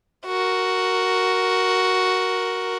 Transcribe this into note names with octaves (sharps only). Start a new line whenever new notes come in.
F#4 A#4